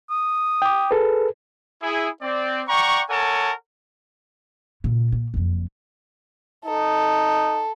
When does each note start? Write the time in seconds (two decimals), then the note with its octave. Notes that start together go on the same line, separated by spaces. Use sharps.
0.10 D#6
0.62 G5 D6
0.91 G#4 A4 B4
1.82 E4 G#4
2.22 C4 D5
2.68 D5 F#5 G5 A#5 C#6
3.10 A4 A#4 C#5 F#5 G#5 A5
4.84 A#2 C#3
5.12 A#2
5.34 F#1 F2
6.66 D#4 A4